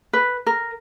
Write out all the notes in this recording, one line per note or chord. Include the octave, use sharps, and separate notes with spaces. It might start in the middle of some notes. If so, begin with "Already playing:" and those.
B4
A#4